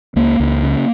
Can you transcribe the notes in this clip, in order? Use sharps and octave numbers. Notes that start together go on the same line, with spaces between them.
C#2 A#3
C#2
C#3